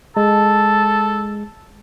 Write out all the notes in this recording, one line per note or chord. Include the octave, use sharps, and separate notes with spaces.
G#3 A4 A5